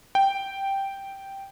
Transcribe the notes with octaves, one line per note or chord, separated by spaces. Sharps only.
G5